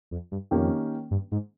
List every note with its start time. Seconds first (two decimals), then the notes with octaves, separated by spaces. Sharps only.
0.11 F2
0.32 G2
0.51 F2 D#3 A#3 C#4 G4
1.11 G2
1.32 G#2